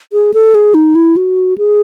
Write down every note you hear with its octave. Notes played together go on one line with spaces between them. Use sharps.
G#4
A4
G#4
D#4
E4
F#4
G#4